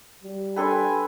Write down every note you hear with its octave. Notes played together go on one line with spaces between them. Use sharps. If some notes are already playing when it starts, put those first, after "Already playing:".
G3
D4 A4 B4 G5 G#5 C6